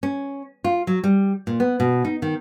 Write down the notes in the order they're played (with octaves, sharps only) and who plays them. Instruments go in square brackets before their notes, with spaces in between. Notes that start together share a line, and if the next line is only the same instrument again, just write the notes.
[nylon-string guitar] C#4
F4
F#3
G3
A#2
B3
B2
D#4
D#3